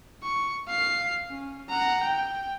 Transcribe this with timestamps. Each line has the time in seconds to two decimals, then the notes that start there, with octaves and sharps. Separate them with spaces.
0.23 C#6
0.68 F5 C7
1.30 C#4
1.70 F#5 A#5
2.03 G5